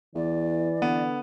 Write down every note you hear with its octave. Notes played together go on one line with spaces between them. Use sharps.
E2 E3 D5
D3 B3